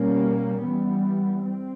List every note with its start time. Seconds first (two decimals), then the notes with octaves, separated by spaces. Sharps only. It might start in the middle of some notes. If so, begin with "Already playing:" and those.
Already playing: B2 G3 A#3 C#4
0.61 E3 G3 B3
1.44 C4